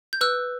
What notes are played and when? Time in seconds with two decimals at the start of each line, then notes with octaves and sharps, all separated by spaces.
0.13 G6
0.21 B4 E6 F#6